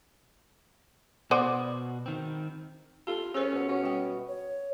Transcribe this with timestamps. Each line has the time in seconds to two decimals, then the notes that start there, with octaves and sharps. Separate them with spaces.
1.31 B2 B3 F#4 C5 D5
2.06 D#3 C4
3.07 F4 G4 A4
3.34 C#4 G#4 A#4 C5
3.52 B2 B3
3.69 C#4 F#4
3.84 G3 G5
4.28 C#5